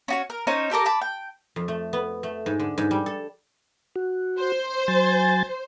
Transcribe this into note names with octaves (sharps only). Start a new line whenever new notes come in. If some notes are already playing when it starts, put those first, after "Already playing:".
C#4 F#4 C#5
A#4
C#4 D#4 C5 C#5
G4 A4 A#4 D6
A5 B5 D6
G5
F2
A3
B3
A3
G#2
D3
G#2
G3
A4
F#4
C5
F#3 G#5 A6